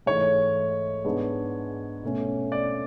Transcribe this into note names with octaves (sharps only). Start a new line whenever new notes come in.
G#2 E3 A3 C#5
G#2 G#3 B3 D4
B2 A3 C#4
D5